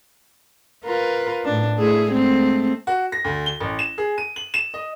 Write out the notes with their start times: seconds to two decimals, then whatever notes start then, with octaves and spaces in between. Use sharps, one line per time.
0.85 F4 A#4 B4
1.44 A2 D4
1.78 A3 E4 G#4
2.10 G#3 A3 C4
2.87 F#4
3.12 A#6
3.24 D2
3.46 G7
3.60 A1
3.79 E7
3.98 G#4
4.18 D#7
4.36 F#7
4.54 E7
4.74 D#5